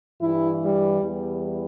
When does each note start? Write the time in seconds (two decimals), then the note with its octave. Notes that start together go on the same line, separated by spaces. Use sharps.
0.21 G2 E3 G3 E4
0.62 G3
1.02 E2 E3 G3